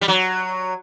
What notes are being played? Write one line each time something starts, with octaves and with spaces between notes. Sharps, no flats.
G3
F#3